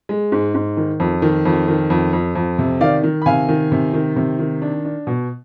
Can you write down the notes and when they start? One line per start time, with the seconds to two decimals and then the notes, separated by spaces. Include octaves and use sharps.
0.09 G#3
0.32 G#2
0.54 G#2
0.77 D#3
1.00 F2
1.22 D#3
1.45 F2
1.68 D#3
1.90 F2
2.13 F2
2.35 F2
2.59 C3
2.81 D#3 D5 F5
3.04 D#3
3.22 B5
3.26 C3 F5 G#5
3.49 D#3
3.72 C3
3.94 D#3
4.16 C3
4.39 D#3
4.62 D4
4.85 D4
5.07 B2